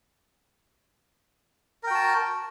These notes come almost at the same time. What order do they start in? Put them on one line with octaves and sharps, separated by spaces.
A#4 G5 F#4 A5